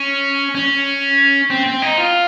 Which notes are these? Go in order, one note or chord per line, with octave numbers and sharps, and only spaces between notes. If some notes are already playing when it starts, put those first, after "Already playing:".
Already playing: C#4
C#4
C4
C4
D#4
F4